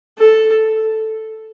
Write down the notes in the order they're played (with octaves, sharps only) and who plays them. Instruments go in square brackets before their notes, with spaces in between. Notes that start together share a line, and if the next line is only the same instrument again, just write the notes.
[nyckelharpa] A4